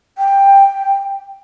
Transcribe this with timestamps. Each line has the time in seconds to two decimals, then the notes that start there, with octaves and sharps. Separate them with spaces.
0.18 G5